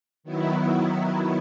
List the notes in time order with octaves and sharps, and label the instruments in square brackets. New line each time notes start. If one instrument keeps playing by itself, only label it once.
[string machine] D#3 F#3 B3 E4